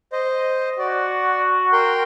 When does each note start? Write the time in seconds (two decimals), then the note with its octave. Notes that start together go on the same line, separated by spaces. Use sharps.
0.13 C5 D#5
0.79 F#4 D5
1.72 A#4 G5 C6